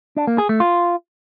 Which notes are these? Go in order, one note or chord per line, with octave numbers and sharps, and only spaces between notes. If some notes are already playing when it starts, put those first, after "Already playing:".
D4
A#3
G#4
A3
F4